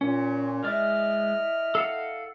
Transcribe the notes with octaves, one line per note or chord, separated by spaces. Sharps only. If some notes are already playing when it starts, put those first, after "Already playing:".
A#2 C#4
G#3 E4 D5 D#5 F6
A4 F5 F#5